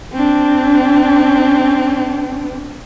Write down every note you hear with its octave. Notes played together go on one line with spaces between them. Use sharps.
C4 D4